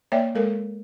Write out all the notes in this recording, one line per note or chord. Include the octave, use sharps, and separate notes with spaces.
A#3 C#5 D5 E5 G5
G#3 A4 A#4